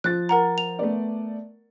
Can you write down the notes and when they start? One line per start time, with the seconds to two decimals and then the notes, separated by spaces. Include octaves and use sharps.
0.04 F3 F#6 A6
0.29 A#4 F#5 A#5
0.58 F7
0.79 A3 B3 D5